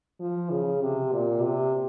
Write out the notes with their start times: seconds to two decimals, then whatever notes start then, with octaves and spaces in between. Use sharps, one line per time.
0.20 F3
0.51 C#3
0.81 C3
1.12 A#2
1.42 C3